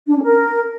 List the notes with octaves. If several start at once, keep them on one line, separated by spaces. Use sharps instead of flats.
D4
C#4
A#4